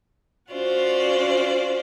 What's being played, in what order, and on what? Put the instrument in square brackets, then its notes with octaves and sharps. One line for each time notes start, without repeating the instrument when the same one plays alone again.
[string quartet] C#4 F4 F#4 C5 D5